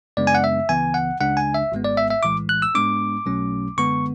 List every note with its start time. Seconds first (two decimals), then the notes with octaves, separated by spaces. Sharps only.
0.17 F#2 C#3 G#3 B3 D4 D5
0.27 G#5
0.35 F#5
0.44 E5
0.69 C#2 C#3 E3 B3 G#5
0.94 F#5
1.20 C#2 C#3 G#3 D4 F#5
1.37 G#5
1.54 E5
1.72 G#1 G#2 G#3 B3
1.84 D5
1.97 E5
2.10 E5
2.23 B1 A2 E3 G#3 D6
2.49 F#6
2.62 E6
2.75 G#2 G#3 B3 D4 D6
3.26 B1 B2 F#3 A3 C#4
3.77 F#2 D3 G#3 B3 C#6